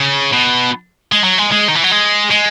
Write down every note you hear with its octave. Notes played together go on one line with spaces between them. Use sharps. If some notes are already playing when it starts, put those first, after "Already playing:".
Already playing: C#3
B2
G#3
F#3
G#3
G#3
D#3
E3
F#3
G#3
G#3